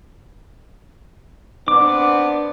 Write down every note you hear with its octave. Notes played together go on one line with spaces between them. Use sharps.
B3 C4 D4 D6